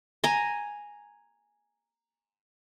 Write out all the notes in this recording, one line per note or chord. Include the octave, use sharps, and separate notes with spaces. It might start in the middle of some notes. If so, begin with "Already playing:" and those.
G#5 A#5